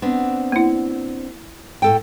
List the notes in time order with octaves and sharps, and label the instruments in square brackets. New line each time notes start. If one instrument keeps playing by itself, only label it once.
[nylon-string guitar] B3 C4 D4
[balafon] A#3 E4
[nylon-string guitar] A2 A4 G5